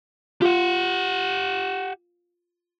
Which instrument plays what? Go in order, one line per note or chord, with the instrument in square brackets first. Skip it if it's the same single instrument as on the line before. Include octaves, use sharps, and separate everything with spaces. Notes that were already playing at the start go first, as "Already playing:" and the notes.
[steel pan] F4 [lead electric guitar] G4 F#5